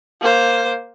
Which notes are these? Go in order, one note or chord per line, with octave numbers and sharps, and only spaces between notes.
A#3 C5